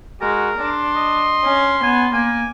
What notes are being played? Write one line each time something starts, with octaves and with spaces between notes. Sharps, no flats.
G#3 F#4 A#4
D4 C6
D#5
C#4
B3 G#5
A#3 G#5